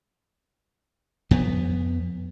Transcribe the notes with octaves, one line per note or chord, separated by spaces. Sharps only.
F2 B3